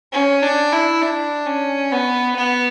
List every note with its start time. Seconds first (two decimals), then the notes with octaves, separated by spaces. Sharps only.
0.13 C#4
0.43 D4
0.72 E4
1.02 D4
1.47 C#4
1.92 B3
2.36 B3